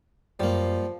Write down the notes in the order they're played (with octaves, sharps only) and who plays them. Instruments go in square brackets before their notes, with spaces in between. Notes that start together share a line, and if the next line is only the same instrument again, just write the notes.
[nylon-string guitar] F#2 [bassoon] F3 [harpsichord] G3 A#3